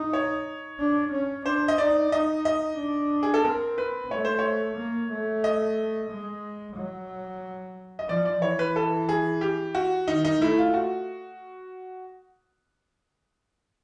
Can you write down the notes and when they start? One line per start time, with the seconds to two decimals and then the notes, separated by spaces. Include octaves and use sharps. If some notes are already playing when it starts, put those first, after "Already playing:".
Already playing: D#4
0.13 C#5
0.80 D4
1.12 C#4
1.46 D4 C5
1.68 D#5
1.78 D#4 D5
2.12 D#4 D#5
2.45 D#5
2.78 D4
3.23 G#4
3.34 A4
3.44 C4 A#4
3.78 B4
4.11 A3 C#5
4.25 C5
4.39 C#5
4.77 A#3
5.11 A3
5.44 D#5
6.10 G#3
6.76 F#3
7.99 D#5
8.09 F3 D5
8.25 D5
8.42 E3 C#5
8.59 B4
8.76 A4
9.09 G#4
9.41 G4
9.75 F#4
10.08 D#3 D#4
10.24 D#4
10.41 A3 E4
10.58 F4
10.74 F#4